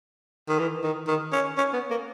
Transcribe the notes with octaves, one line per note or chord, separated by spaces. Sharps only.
D#3
E3
D#3
D#3
C#4
C#4
B3
A#3